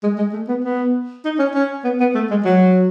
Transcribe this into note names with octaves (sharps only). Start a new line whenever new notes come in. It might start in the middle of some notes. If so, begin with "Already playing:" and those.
G#3
G#3
A3
B3
B3
D#4
C#4
C#4
B3
B3
A3
G#3
F#3